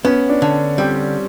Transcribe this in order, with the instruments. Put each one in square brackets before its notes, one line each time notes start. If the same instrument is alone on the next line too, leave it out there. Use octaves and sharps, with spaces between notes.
[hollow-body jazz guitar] B3 [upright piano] C#4
[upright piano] D4
[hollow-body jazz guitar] D3
[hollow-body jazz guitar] G3 [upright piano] C4